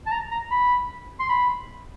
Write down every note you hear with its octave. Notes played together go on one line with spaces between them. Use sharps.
A5
A#5
A#5
B5
C6
B5